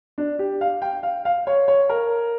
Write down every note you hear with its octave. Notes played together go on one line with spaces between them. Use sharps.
D4
G4
F5
G5
F5
F5
C#5
C#5
A#4